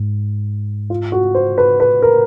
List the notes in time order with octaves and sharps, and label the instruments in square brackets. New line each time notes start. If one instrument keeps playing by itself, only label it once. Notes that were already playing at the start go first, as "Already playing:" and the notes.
Already playing: [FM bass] G#2
[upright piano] F4
F#4
C5
B4
[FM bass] A2 [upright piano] B4
[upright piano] A#4